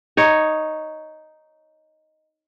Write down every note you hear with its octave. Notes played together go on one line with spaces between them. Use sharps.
D#4 C#5